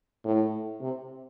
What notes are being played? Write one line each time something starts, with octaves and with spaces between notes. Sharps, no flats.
A2
C3